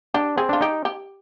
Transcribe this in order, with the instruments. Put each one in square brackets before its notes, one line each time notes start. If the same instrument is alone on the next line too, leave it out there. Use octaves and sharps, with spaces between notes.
[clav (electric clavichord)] D4 [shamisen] G4
[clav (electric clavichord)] C4 [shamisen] G#4
[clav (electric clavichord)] D4 [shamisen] F4
[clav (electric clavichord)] D#4 [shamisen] G4
[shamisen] G4